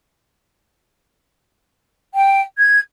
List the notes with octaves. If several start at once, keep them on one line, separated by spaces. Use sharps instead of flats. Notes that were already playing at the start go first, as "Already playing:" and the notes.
G5
G#6